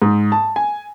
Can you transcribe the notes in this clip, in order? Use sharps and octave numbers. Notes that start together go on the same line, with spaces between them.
G#2
A5
G#5